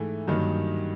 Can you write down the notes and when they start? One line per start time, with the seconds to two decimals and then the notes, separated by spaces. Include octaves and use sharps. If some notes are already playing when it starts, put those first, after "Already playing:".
Already playing: G#2 E3 A3
0.28 G2 D#3 F#3 A#3 D#4